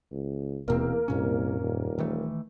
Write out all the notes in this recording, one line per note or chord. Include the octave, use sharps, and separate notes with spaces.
C#2
D#1 E2 B2 A#3 C4 A#4
C2 F#2 A#2 C#4
D#1
D#3 E3 A3